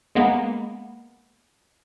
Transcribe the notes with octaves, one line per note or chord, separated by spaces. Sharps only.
G#3 A#3 B3